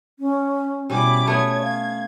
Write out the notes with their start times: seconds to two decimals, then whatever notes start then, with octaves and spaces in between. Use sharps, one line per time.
0.19 C#4
0.90 B2 G3 C#4 E4 D6
1.27 A3 B3 C#5 G#6
1.62 F5